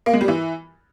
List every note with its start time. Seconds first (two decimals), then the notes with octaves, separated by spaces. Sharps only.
0.06 A#3
0.14 G#3
0.21 G3
0.28 E3